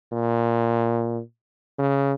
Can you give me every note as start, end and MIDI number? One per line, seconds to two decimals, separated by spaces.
0.13 1.21 46
1.79 2.13 49